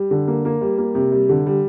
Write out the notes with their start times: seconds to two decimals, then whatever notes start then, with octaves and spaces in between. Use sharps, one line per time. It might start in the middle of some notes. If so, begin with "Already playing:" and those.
Already playing: G3
0.11 D3
0.28 A#3
0.45 A#3
0.61 G3
0.78 A#3
0.95 C3
1.12 G3
1.29 D3
1.46 G3